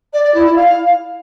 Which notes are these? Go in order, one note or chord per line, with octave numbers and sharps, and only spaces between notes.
D5
D5
E4
E4
F5